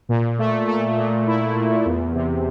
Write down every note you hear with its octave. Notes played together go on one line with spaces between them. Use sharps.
A#2
A3
A3
A#2
E4
A#2
E2
C3